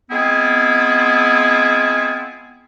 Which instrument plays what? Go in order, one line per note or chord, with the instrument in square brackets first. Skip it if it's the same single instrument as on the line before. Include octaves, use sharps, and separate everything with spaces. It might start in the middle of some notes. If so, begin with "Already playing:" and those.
[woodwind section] G#3 B3 C4 E4 F4 G#4